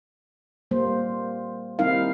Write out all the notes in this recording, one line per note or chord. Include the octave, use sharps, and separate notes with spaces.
G3 A#3 C5
G3 C4 D#4 E4 A#4 F5